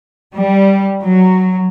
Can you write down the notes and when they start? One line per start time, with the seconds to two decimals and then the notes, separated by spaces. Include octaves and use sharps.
0.34 G3
1.02 F#3